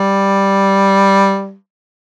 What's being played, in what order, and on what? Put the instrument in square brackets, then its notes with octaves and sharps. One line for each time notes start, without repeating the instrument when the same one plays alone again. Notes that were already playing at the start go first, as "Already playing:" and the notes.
Already playing: [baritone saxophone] G3